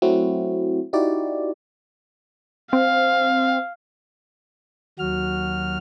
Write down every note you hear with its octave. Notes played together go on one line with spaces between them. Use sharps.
F#3 A3 C4 E4 F#4
D#4 E4 F#4 G4 D5
C4 F5
D#2 F#3 F#4 F6